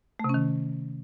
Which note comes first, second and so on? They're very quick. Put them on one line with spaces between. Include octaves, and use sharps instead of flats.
A3 C3 C#4 D#3